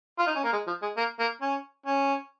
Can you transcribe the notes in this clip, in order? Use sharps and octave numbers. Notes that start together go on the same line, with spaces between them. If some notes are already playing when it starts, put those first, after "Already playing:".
F4
D#4
C#4
A#3
G#3
F3
G#3
A#3
A#3
C#4
C#4